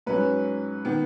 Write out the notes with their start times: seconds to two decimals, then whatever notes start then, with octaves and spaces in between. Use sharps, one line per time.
0.06 G#2 F#3 C#4 B4
0.85 D#3 B3